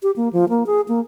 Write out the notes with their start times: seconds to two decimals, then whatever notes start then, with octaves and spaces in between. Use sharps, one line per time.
0.03 G4
0.16 A#3
0.33 F3
0.49 A#3
0.66 G#4
0.88 A#3